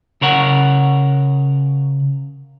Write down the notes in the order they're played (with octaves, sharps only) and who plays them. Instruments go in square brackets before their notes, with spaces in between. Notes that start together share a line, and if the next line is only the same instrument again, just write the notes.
[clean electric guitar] C#3 A#4 C#5 F#5